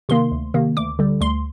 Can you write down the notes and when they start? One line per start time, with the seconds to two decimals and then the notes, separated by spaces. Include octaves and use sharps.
0.09 C3 D#3 A#3 C6
0.32 D2
0.54 C3 D#3 A#3
0.77 D2 D6
0.99 D3 G3
1.21 D2 C6